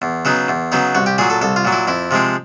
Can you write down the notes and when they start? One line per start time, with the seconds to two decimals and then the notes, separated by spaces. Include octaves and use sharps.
0.02 E2
0.25 C#3 F#3 B3 D#4
0.48 E2
0.72 C#3 F#3 B3 D#4
0.95 C2 F#4
1.06 G4
1.18 A#2 F#3 G#4
1.30 A4
1.41 C2 A4
1.56 F4
1.65 A#2 F#3
1.72 E4
1.87 F2 E4
2.11 C3 F3 G#3 C4